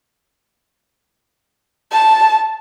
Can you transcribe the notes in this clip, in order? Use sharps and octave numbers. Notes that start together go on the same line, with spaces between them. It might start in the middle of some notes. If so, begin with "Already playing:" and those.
A5